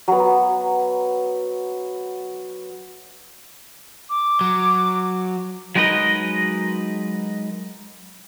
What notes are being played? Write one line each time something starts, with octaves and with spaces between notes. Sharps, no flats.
F#3 B3
D6
F#3
F#3 G#3 D#4 A#4 B4 D#5